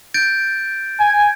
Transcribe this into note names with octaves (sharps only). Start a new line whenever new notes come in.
G6 A6 D7
G#5